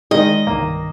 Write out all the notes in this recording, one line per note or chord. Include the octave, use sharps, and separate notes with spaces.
D#3 G#3 D#5
C2 G2 D#3 A#3